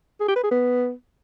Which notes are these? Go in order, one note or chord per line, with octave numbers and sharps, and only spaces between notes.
G#4
G4
B4
G#4
B3